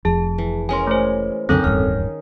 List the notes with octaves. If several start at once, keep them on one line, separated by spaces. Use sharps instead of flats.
F1 F2 G#4 A5
E3
G#3 C#4 A#4 G#5 C6
A3 C5
C2 F#2 D3 D#3 C4 C#4 D#4 A4
D1 E2 G2 F6